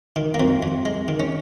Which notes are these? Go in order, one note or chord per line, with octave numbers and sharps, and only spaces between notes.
D#3
A#3
F2 C4
F2
G#3
D#3
C#4